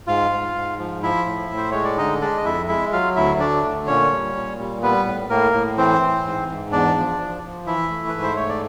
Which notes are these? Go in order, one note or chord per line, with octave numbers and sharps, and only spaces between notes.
G#2 F4 F5
G#2
G#2
F3
F3 E4 E5
A2
A2
C5
G#3 C#5
D5
D3 D#4 D#5
G#3 D4 D5
D#5
F2 E4 E5
G#3 E4 E5
F#3 F4 F5
D2 E4 E5
A3 D4 D5
D3
A#2 C#4 C#5
G3
A#2
G3
G3 B3 B4
A2
A2 A#3 A#4
A2
E3 C4 C5
E3
G#2
G#2
E2 D4 D5
F3
F3
F3
E3 E4 E5
A3
B4
G#2
C5
A3 C#5
D5